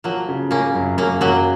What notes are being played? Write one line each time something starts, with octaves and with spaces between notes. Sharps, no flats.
F3 F#3 A#3
C#3
C#3 A#3 C#4
F#2
F#2 A#3 C#4
F#2 F#3 A#3